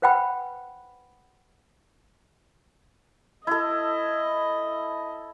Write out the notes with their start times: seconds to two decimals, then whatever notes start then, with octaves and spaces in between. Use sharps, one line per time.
0.02 B4 C5 F#5 G5 B5
3.47 E4 A4 D#5